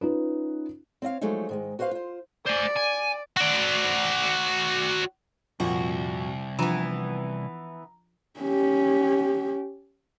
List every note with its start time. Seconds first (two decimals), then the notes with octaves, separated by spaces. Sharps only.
0.01 C#4 D#4 F4 B4
1.02 C4 C#5 D#5 F5
1.21 F3 F#3 G#3 A3 D#4
1.49 G#2 D#3 G#3
1.79 F#4 B4 C5 E5 F5
1.91 F4 C5
2.46 C5 D5 G#5
2.76 G#5
3.37 F#4 D5
5.60 C2 F2 A#2 F#4
6.59 E3 F3 B3 D4 F4 A#5
8.40 C#4 G4